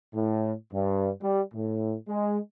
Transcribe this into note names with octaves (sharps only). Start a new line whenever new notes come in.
A2
G2
G3
A2
G#3